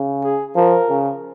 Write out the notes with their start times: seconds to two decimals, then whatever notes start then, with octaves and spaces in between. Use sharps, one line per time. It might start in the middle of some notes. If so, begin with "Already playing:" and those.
Already playing: C#3
0.24 G#4
0.56 F3 A#4
0.89 C#3